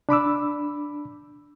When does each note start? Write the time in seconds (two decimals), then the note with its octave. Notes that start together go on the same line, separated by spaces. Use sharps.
0.09 D4 B5 D6 E6